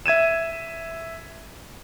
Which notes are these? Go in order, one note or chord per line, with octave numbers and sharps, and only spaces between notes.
E5 G#6 D#7 E7